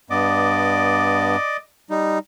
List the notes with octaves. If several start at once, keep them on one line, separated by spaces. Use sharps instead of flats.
G2 B3 D5 D#5 D6
G3 D#4